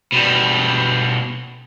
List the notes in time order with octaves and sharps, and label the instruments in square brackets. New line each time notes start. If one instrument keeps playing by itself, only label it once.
[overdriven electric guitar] B2 G3